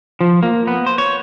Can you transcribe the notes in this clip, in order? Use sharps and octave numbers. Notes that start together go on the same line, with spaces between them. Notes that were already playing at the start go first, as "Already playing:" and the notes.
F3
A#3
B3
C5
C#5